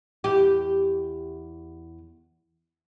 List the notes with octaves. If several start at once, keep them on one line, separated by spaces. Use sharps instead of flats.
E2 G4